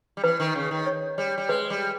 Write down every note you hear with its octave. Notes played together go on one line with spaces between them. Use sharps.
G3
E3 B4
D#3
C#3
D#3
C#5
G3 C#5
G3
G#3 B4
G3